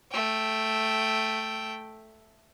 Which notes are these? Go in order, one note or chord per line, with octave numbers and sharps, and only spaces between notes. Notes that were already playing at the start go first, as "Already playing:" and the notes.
A3 G5